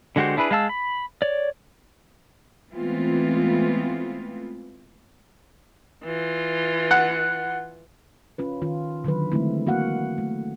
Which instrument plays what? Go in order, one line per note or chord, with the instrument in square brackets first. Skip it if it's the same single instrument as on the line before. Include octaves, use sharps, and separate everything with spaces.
[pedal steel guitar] D3 G#3 F#4 G4 C5
D4 E4 G#4 B4
G#3 F5 A5 E6
B5
C#5 D5
[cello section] E3 G#3 A3 B3 C4 F4
[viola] E3 F4
[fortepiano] F#5
[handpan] C#4 F4 B4
D#3 F4
D3 D#3 F#3 B4
D3 E3 G#3 A3 C4 E4
A#3 F#4 F5 F#5
A3